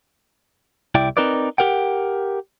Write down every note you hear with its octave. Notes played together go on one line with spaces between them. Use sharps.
C2 E4 D5 G5
C4 D#4 A#4 B4 D5
G4 A#4 F#5 G5